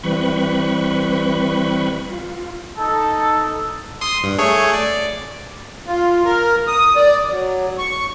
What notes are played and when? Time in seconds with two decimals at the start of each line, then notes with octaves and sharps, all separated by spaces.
0.04 E3 G3 C4 B4 B5 C#6
2.09 F4
2.78 D#4 A4
4.01 C6 D#6
4.23 G2
4.38 A3 G#4 C#5
4.73 D5
5.86 F4
6.25 A#4
6.67 D#6
6.96 D5
7.30 F#3
7.79 C#6